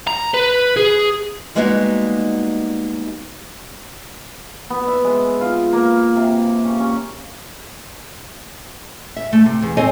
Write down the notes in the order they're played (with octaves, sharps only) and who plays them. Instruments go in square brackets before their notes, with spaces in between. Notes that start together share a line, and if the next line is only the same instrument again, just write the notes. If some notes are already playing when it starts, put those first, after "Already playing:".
[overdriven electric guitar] A#5
B4
G#4
[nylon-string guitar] G3 G#3 A#3 B3 D#4 F#4
[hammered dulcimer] B3
E5
G#3
F4
A#3
C3
C#4
C#4
[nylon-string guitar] E5
A3
C3
E2
C4 A4 C#5 D#5 G#5